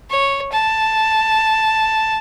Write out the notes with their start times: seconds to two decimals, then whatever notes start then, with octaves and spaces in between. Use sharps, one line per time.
0.10 C#5
0.53 A5